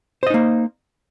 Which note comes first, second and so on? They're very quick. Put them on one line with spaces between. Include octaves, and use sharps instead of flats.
C5 D#5 D#4 A#3